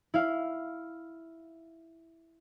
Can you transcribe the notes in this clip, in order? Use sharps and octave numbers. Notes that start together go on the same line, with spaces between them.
E4 F5